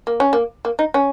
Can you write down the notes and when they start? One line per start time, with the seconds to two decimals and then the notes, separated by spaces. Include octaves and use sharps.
0.07 A#3
0.20 C#4
0.33 A#3
0.65 A#3
0.79 D#4
0.94 C#4